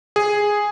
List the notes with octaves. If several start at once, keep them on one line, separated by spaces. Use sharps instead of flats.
G#4